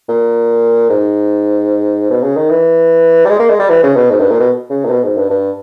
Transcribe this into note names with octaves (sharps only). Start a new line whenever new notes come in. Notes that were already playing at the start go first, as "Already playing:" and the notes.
A#2
G#2
B2
C#3
D#3
E3
G3
G#3
A#3
G#3
G3
E3
C#3
B2
G#2
G2
A#2
B2
C#3
A#2
B2
G#2
G2
G2